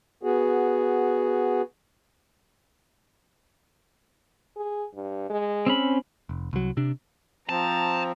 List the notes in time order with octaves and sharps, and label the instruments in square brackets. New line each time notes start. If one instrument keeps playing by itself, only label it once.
[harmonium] B3 F#4 G#4
[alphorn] G#4
G2
G#3
[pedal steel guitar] C4 C#4 B5
[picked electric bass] F1
C2 F#3
C3 D4
[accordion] F3 C4 [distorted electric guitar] A5 [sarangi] A#5